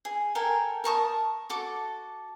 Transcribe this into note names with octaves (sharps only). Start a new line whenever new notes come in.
G#4
A4 A#4 G5 G#5
A#4 A5 C#6 D#6
F#4 A4 D6